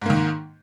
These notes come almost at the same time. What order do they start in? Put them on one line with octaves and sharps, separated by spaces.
G#2 A#3 D#3